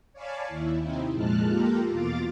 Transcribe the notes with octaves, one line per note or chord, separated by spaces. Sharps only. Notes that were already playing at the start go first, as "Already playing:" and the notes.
C#5 D5 F5 G#5 A5 B5
D#2 E4
C3 C4 D#4 E4
F2 A#2 G#3 A5 F6 F#6
A#3 F4 G4 A4 A#4
E2 B2 F4 F5 D6 A6